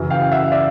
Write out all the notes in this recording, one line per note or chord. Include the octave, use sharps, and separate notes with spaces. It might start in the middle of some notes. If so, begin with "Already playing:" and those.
Already playing: F#2 C#3 E3
F5 G5
E5 F#5
D5 E5